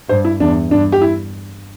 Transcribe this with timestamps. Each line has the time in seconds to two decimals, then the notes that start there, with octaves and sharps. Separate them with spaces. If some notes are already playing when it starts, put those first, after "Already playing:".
0.09 G2 C5
0.25 E4
0.40 E2 D4
0.71 G2 D4
0.92 G4
1.01 E4